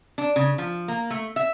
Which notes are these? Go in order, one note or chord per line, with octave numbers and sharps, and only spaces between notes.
D4
C#3
F3
A#3
A3
E5